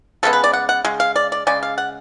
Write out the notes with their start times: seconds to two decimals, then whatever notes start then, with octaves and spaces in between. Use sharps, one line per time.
0.23 C#3 G#3 B3 A4
0.33 B4
0.44 D5
0.53 F#5
0.69 F#5
0.85 C#3 G#3
1.00 F5
1.16 D5
1.32 D5
1.47 C#3 G#3 D5
1.63 F5
1.78 F#5